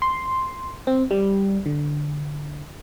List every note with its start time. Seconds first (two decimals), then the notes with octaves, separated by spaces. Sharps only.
0.02 C6
0.87 C4
1.11 G3
1.66 D3